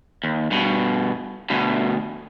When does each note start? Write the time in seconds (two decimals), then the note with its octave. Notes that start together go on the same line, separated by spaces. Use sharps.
0.24 D#2
0.51 G2 B2
1.50 D2 B2